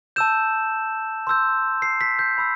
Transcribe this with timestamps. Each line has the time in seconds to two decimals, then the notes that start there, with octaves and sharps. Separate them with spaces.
0.16 A5 E6 G6 E7
1.27 C6 E6 G6
1.82 C7
2.01 B6
2.19 G6
2.38 B5 E6